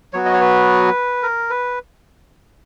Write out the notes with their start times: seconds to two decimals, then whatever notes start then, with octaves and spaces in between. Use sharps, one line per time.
0.13 F#3 B3 F#4 C#5
0.26 D#5
0.33 C#5
0.41 B4
1.23 A#4
1.50 B4